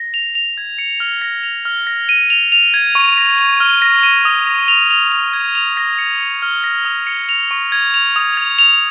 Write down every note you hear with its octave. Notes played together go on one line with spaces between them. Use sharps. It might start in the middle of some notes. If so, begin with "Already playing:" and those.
Already playing: A#6
F7
F7
G#6
C#7
F6
A#6
F7
F6
A#6
D#7
F7
F7
G#6
C#6
A#6
F7
F6
A#6
D#7
D#6
A#6
F7
F7
F7
G#6
F7
A#6
C#7
C#7
F6
A#6
D#6
C#7
F7
C#6
G#6
F7
D#6
G#6
F7